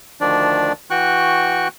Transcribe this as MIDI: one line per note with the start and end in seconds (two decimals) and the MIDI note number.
0.21 0.72 38
0.21 0.72 51
0.21 0.72 53
0.21 0.72 62
0.21 0.72 74
0.90 1.68 52
0.90 1.68 66
0.90 1.68 79
0.90 1.68 85
0.90 1.68 90